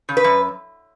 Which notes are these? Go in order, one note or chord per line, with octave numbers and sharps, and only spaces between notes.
C#3
B4
F#2